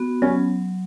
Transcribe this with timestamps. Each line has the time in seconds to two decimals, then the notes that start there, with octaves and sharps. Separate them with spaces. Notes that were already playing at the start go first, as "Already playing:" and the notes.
Already playing: B3 F#4
0.22 F#3 C#4